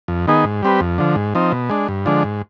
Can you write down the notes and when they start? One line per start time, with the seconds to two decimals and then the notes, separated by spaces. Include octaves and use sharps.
0.08 F2
0.27 D#3 B3 D#4 G#4
0.44 G#2
0.63 G3 C4 G4 B4
0.81 F2
0.98 D3 F3
1.16 G#2
1.35 F3 C4 D#4
1.52 B2
1.70 G#3 D4
1.88 G2
2.06 D3 F3 G#3 D4
2.24 G#2